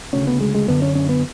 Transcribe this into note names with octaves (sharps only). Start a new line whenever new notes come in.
D2 C#3 C#4
B3
G#3
G#3
F#2 D3 B3
C#4
C#4
B3